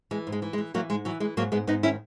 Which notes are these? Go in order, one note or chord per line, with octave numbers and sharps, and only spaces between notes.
E3 G#3
G#2
G#3
E3
G#3
E3
E3 F#3 A#3
G#2 G#3
E3 F#3
E3 G#3
G#2 F#3 A#3
G#2 G#3 B3
G#2 B3 D#4
D#3 C#4 E4